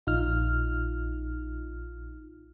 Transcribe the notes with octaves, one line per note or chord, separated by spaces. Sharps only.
A#1 D#4 F4 F6